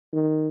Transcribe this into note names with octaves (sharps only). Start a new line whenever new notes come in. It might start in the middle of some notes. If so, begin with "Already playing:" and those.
D#3